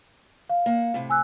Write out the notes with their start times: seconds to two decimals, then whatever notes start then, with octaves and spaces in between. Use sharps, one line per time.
0.50 F5
0.66 A#3 F#5
0.94 A2 C3
1.10 G#5 E6 F#6